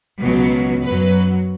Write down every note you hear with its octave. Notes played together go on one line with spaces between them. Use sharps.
C#2 B2 F#3
F#2 F#3 B4